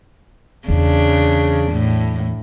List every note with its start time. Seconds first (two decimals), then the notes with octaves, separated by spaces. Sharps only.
0.68 E2 C#3 D4
1.72 A2